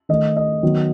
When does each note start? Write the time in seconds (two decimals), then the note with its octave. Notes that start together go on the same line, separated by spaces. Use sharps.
0.09 D#3 A3 D#5
0.37 D#5
0.63 D#3 F#3 B3